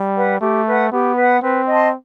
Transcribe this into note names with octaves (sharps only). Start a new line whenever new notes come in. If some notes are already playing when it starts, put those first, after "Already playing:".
Already playing: G3
B4 F#5
A3 G4
B4 F#5
B3 G4
B4 F#5
C4 B4
D#5 A5 C6